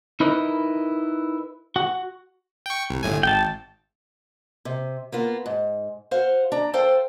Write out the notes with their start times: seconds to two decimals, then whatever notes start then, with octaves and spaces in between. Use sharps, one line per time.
0.20 D#4 E4 A#4 B4 D#5
1.76 F#4 F#5
2.66 G5 C#6
2.90 C2
3.03 G1 A2 G#5
3.23 G#1 G5 A5
4.65 C3
5.12 A#3 B3 F4
5.46 G#2
6.11 F#4 C5 F5
6.52 D4 A#5
6.74 A4 C5 F5 G5